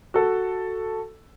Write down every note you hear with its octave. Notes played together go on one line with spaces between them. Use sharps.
F#4 A4